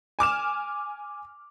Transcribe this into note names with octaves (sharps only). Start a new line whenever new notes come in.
G#5 D6 F6 E7